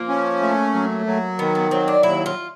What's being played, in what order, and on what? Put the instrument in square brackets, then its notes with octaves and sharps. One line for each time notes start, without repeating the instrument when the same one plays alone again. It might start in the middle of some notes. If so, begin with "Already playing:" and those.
Already playing: [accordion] F3 [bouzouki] A#3
[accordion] C#4
A3
F#3
F#3
[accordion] D#3 [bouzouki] B3
[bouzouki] B3
[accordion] F#3 [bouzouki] C4
[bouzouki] D4
[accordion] D#2 [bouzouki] E4
[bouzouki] F4